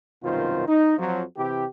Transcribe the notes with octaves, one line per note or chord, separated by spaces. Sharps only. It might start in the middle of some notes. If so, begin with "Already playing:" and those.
C2 F#2 B2 D#3 F4 C5
D#4
F2 F3 F#3
C3 E3 E4 G4